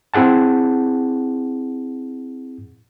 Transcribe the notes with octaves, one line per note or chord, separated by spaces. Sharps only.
C4 E4 G#4 F#5 A5